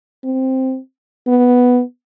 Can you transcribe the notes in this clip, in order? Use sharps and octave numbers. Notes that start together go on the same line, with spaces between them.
C4
B3